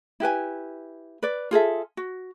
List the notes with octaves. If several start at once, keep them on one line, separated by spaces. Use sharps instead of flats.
E4 G4 B4 G#5
B4 D5
F4 G#4 A4 E5
F#4